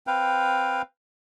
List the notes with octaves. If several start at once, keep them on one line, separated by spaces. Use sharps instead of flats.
C4 B4 F5 G5